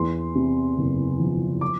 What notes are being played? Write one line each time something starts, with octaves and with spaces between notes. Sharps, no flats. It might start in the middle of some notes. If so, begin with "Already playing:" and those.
Already playing: E2 C6
C3
F#1
F3
D6